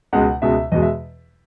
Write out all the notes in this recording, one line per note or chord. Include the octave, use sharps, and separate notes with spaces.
C#2 B2 G#3 F#5
C#2 B2 G#3 E5
E2 B2 G#3 D#5
E5